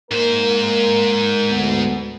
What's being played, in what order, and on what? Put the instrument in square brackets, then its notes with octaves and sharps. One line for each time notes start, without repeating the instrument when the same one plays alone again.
[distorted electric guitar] G#2 C5 [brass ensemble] A#3 A#4
[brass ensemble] D2 B3